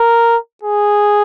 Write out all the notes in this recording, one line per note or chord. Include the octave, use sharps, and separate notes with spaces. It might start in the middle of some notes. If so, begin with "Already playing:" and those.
Already playing: A#4
G#4